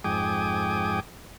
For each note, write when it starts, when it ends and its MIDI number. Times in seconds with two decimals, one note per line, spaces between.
0.04 1.00 41
0.04 1.00 44
0.04 1.00 79
0.04 1.00 80
0.04 1.00 86
0.04 1.00 87